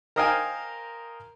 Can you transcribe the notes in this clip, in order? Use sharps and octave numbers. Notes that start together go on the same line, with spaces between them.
A#4 C5 D#5 F5 G5 G#5